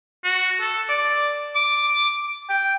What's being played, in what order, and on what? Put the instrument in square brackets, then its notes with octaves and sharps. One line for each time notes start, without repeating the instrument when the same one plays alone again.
[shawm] F#4
A4
D5
D6
G5